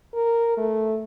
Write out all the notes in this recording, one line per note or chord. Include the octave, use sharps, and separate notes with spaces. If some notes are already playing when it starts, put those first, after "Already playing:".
A#4
A3